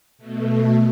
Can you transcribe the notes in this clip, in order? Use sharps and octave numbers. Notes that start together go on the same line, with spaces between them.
B2 A3